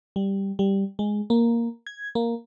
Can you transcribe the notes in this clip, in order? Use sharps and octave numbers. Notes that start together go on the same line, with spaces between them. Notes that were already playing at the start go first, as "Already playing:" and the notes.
G3
G3
G#3
A#3
G#6
A#3